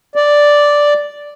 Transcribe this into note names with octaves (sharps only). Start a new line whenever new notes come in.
D5